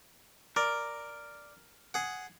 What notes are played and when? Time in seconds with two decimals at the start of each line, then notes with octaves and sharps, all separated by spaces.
0.56 A#4 D5
1.94 G#4 F#5